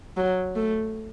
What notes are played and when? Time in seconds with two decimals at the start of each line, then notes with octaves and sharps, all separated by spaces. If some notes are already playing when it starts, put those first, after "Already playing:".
0.17 F#3
0.55 A3